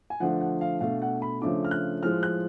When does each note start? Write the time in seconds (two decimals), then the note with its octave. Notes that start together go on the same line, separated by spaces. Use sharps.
0.10 G#5
0.20 D3 F3 A3 D4 F#5
0.41 F#5
0.61 F5
0.80 B2 A3 D4 F5
1.02 F#5
1.22 B5
1.42 C#3 F3 A3 D4 D6
1.65 F6
1.71 F#6
2.03 A2 F3 G#3 F6
2.23 F#6